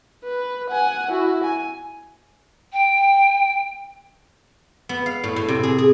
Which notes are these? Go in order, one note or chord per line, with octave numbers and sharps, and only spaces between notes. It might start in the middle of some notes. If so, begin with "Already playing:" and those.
B4
F#5 G#5
E4 F#4
G#5
G5
B3
F5
A2
A2
C3
G#4
G#4